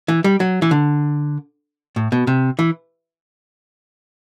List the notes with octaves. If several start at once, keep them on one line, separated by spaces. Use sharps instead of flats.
E3
G3
F#3
E3
D3
A2
B2
C3
E3